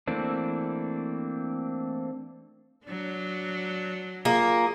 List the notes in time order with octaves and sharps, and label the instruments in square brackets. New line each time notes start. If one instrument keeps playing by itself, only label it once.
[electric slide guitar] E3 A3 A#3 C4 D4
[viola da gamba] F#3 D4
[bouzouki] A#3 [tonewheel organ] F4 G#4 D#6